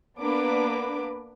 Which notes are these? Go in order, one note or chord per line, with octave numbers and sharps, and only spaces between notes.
A#3 B3 D4 B4 D6